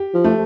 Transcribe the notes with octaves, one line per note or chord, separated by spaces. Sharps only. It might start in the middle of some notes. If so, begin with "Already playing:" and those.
Already playing: G4
F3
A3